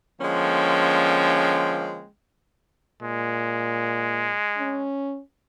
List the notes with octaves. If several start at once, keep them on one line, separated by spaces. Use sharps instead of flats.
D3 F3 G#3 A#3 C#4 G5
A#2 G#3
C#4